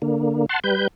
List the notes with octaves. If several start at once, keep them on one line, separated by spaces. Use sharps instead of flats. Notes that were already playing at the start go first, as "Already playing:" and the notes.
D3 A#3
F#5 A5 C6
G3 B4 G6